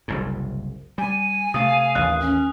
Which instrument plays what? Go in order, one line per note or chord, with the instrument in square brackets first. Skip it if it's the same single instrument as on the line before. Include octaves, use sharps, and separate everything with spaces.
[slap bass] F#1 C2 G#2
[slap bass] G3 [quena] G#5
[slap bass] C3 A3 [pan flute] F5 [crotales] D#6
[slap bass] A1 D#2 [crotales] F#6
[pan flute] C#4